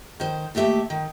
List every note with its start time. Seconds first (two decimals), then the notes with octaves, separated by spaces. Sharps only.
0.20 D#3 C5
0.55 D#2 A3 G4 E5
0.90 D#3